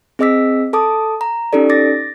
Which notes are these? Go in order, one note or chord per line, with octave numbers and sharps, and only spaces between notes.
C4 G#4 D#5 D6 E6 B6
A4 A5 D6 D#6
A#5
C#4 D#4 G4 A4 D5
D6 A6 A#6